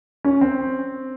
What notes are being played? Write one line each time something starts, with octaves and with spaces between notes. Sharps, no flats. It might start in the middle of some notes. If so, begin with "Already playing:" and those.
C#4
C4